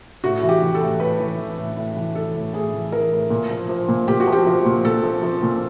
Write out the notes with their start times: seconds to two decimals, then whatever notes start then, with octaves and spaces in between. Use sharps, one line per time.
0.24 A2 F#4
0.43 E3
0.49 G4
0.61 E3
0.75 A4
0.81 A2
1.00 A2 B4
1.20 E3
1.39 E3
1.58 A2
1.77 A2
1.96 E3
2.15 E3 A4
2.35 A2
2.54 A2 G#4
2.73 E3
2.92 E3 A#4
3.12 A2
3.30 A#2
3.50 F3
3.69 F3
3.89 A#2
4.08 A#2 G4
4.20 F#4
4.27 F3
4.32 G4
4.46 F3
4.66 A#2
4.85 A#2 A4
5.03 F3
5.23 F3
5.43 A#2